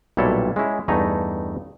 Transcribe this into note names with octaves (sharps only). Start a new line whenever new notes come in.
B1 A#2 G3 E4 A4 C#5
G#3 C#4 E4
E2 G2 A3 D#4 G#5 A#5